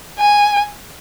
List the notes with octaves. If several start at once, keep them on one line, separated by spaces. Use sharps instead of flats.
G#5